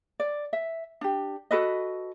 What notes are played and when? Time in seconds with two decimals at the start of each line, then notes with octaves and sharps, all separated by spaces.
0.20 D5
0.53 E5
1.01 D4 G4
1.51 F#4 A4 B4 D#5